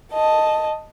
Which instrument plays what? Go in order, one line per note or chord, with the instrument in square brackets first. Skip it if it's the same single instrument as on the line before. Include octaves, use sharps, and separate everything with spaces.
[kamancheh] D#5 A5